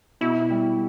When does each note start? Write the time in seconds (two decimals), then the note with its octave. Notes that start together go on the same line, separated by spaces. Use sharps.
0.21 B2 E4
0.50 G3